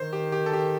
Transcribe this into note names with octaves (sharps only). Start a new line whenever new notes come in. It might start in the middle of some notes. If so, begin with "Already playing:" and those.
Already playing: D#3 C5
G4
G4
A4
G4